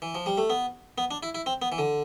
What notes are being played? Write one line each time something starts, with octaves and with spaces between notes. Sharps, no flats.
E3
F3
G3
A3
B3
B3
D4
E4
E4
C4
B3
E3
D3